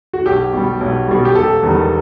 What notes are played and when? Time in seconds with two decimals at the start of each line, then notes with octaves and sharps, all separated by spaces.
0.13 F#4
0.26 B1 G4
0.53 B2 G3
0.81 B1
1.08 B2 G3
1.25 G4
1.35 E1 A4
1.63 E2 D#3 G3